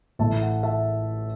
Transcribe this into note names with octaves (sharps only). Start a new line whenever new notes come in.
A1 A2 A3 E4 E5 A5
F#5
E5 A5